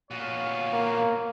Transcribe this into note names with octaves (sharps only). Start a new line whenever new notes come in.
A#2 B3 C#5 F5
A#3